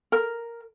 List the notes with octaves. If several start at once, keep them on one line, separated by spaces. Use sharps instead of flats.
A#4